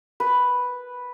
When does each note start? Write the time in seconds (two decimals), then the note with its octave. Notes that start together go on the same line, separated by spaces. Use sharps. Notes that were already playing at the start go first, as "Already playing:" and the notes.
0.20 B4